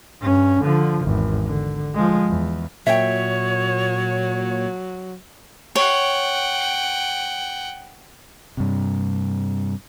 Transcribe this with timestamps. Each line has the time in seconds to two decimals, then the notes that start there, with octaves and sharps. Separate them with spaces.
0.21 G2 C#4
0.62 D3 F3
1.04 G#1 E2
1.45 D3
1.95 F3 G#3
2.29 E2
2.87 A#2 F#3 C#5 E5 G5
5.76 C#5 F#5 G5
8.57 G2 C3